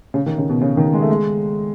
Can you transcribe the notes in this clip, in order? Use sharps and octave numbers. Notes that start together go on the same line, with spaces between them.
C#3
D#3
C#3
B2
C#3
D#3
G#3
A3
G#3